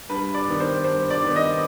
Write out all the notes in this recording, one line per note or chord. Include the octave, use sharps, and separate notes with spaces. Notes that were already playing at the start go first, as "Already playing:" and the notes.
G2 B4
D5
D#3 B3
C5
G2 C5
D5
D#3 B3
D#5